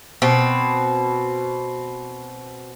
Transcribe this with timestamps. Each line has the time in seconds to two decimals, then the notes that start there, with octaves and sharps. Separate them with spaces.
0.22 B2 C4